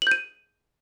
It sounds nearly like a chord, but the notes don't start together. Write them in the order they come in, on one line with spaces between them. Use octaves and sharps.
F#7 G6 D#7